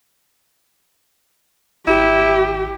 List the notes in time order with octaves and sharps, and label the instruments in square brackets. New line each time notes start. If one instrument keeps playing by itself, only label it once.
[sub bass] G#1 [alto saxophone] E4 [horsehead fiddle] G4